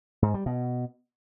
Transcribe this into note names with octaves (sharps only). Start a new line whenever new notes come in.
G#2
G3
B2